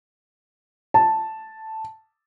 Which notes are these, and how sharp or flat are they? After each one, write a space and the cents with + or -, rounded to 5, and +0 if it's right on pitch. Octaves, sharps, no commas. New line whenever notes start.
A5 +0